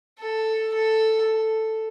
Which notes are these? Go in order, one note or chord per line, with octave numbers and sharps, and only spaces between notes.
A4
A4